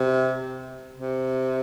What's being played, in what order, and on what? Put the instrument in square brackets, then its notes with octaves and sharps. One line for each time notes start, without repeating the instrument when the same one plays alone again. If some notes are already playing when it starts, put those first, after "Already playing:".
Already playing: [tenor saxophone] C3
C3